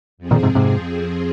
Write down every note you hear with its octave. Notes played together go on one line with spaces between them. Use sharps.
F2 F3 C4 G#4
A#2 D#3
G#2 C3
G#2 C3